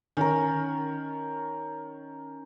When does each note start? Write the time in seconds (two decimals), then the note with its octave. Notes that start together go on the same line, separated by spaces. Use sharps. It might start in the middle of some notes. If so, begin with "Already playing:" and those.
0.17 D#3 C#4 A#4